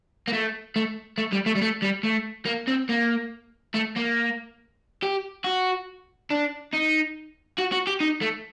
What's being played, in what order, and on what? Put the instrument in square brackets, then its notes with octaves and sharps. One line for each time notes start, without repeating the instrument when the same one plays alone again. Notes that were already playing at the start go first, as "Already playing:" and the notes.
[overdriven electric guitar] A#3
A3
A3
A3
G3
A3
G3
A3
G3
A3
A#3
C4
A#3
A3
A#3
G4
F#4
D4
D#4
F#4
F#4
G4
D#4
A3